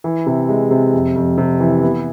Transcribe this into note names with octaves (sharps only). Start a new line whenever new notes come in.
E3
C3
G#3
C3
F2
F2
C3
E3
B3